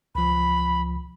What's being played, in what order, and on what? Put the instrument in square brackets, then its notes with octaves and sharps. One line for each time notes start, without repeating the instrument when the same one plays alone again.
[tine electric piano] C#2 F3 [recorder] B5